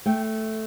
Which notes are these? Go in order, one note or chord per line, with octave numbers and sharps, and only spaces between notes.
A3 G5